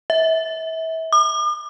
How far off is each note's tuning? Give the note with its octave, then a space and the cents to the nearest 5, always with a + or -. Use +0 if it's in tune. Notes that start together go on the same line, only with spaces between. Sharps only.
E5 -30
D6 +45